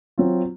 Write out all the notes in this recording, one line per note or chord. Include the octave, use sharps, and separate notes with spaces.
F#3 C4 F4